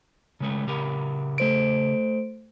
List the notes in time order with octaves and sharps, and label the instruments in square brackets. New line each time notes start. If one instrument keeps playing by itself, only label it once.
[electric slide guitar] C#3 G#3 A3
C#3 G4 A#4
[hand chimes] A3 C5 D7